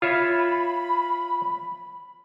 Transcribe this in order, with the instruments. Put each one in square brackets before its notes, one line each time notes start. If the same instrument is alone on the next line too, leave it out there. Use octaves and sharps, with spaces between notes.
[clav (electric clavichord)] F4 C#5 E5 [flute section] B5